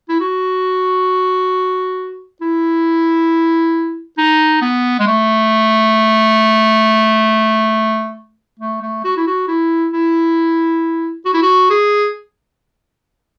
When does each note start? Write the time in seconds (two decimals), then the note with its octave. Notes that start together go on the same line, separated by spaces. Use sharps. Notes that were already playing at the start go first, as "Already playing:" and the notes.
0.09 E4
0.20 F#4
2.41 E4
4.18 D#4
4.61 B3
4.99 G#3
5.07 A3
8.59 A3
8.82 A3
9.04 F#4
9.17 E4
9.27 F#4
9.48 E4
9.93 E4
11.25 F#4
11.33 E4
11.42 F#4
11.70 G#4